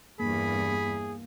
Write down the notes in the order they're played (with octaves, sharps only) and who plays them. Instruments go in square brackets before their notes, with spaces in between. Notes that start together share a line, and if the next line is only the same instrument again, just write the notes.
[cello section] E2 G2 [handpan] A#3 [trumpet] G#4 [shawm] B5